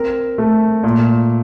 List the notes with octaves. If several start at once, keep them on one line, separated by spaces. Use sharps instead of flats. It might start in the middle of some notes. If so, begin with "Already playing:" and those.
Already playing: C4 A#4
A3
A#2